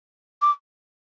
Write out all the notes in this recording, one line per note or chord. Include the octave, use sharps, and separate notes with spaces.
D6